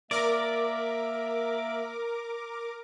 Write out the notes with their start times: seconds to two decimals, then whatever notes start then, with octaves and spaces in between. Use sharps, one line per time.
0.11 A#3 A#4 D5 E5 D6